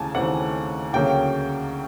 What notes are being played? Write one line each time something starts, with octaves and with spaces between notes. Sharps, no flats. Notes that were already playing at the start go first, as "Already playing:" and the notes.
Already playing: D#2 C#3 E3 A3 G#5 A5
D#2 C#3 E3 A3 C4 F#5
D2 C#3 F#3 A#3 C#4 G5